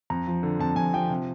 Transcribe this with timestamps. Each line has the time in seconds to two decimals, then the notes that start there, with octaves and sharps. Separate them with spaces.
0.10 F2 A#5
0.27 F3
0.43 D3
0.59 F2 A5
0.76 F2 G#5
0.93 F3 G5
1.10 C3